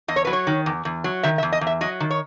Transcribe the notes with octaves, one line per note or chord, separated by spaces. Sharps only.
E2 D#5
C#5
F#3 B4
C#5
D#3
E2
E2
F#3
D#3 E5
E5
E2
D#5
E2
E5
F#3 D#5
D#3
C#5